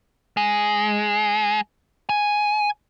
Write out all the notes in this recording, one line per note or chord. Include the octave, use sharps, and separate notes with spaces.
G#3
G#5